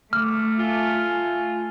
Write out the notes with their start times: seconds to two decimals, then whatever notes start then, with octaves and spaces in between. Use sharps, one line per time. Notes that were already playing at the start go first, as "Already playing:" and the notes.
0.13 A3 D6 F6
0.59 F4 G#5